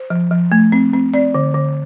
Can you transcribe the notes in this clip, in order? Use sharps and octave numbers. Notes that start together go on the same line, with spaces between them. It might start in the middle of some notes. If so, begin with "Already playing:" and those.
Already playing: C5
F3
F3
A3
C4
C4
C4 D5
D3
D3